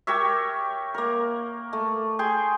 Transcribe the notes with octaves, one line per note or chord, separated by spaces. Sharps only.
G4 A#4 C#5 E5
A#3 A#4
A3
G#4 G5 C6